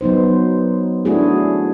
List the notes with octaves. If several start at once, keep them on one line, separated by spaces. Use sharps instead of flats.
F#3 B3 D#4 C5
A3 D4 E4 F#4 G#4